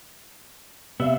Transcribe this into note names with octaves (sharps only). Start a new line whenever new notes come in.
C3 B3 D5 E5 F5